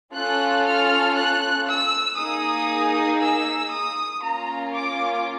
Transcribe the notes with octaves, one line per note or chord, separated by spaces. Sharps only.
C#4 F4 A4 F#6
F6
F#6
E6
A#3 D#4 G#4 D#6
E6
D#6
A#3 C#4 F4 A#5
D6